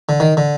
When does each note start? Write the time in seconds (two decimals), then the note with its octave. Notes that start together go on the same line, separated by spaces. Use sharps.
0.09 D3
0.20 D#3
0.37 D3